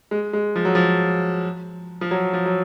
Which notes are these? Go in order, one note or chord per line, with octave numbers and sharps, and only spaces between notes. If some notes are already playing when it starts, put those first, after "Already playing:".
G#3
G#3
F3
F#3
F3
F3
F#3
F3
F#3